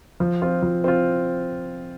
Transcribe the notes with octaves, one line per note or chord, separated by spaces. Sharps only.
F3
C4 F4
F3
C4 F4